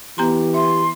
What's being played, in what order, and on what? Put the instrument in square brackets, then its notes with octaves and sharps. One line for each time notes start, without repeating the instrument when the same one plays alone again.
[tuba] E3 [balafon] B3 A#5 C6 [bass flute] G4
[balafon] E5 [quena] C6